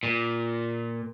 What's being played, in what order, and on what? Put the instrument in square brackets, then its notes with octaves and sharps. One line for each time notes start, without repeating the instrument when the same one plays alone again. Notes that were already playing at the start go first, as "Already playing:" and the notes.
[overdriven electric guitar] A#2